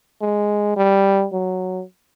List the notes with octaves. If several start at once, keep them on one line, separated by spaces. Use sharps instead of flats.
G#3
G3
F#3